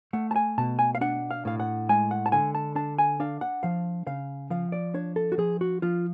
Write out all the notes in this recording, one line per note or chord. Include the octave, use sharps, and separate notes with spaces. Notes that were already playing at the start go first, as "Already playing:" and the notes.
A3 F#5
A5
G#5
B2 A5
G#5
F5
D4 F#5
F5
A2 F5
F#5
G#3 G#5
F#5
A5
D3 G#5
A5
D4 A5
G#5
D4 F5
F#5
F3 F5
C#3 F5
F3 F5
D5
D4 C#5
A4
F#4
F3 G#4
F#4
F3 F4